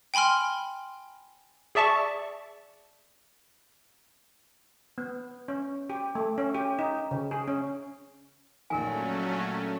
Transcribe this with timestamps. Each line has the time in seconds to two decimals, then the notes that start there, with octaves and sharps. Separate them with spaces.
0.14 G5 G#5 B5 C6 F6
1.75 G#4 D5 E5 A5 C#6
4.98 B3
5.48 C#4
5.90 G4
6.15 A3
6.38 C#4
6.55 G4
6.79 D#4
7.11 C#3
7.31 G#4
7.47 C#4
8.70 A#1 D#3 F#3 A3 C#4 A#4 G#5